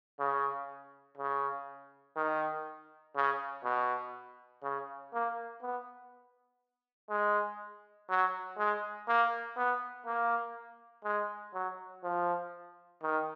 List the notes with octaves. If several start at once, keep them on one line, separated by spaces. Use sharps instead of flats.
C#3
C#3
D#3
C#3
B2
C#3
A#3
B3
G#3
F#3
G#3
A#3
B3
A#3
G#3
F#3
F3
D#3